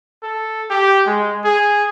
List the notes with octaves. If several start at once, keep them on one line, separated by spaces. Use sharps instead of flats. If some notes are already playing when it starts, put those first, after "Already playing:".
A4
G4
G#3
G#4